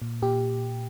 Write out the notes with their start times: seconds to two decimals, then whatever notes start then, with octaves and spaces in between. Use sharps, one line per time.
0.02 A#2
0.22 A#2 G4